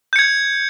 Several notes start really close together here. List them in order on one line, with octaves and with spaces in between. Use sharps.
G6 C#7 G#6